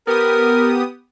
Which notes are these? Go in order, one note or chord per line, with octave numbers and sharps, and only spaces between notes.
B3 G4 A#4 D#6